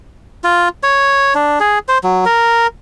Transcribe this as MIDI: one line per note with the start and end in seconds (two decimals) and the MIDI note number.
0.44 0.68 65
0.83 1.34 73
1.35 1.59 62
1.60 1.79 68
1.88 1.98 72
2.04 2.25 54
2.25 2.67 70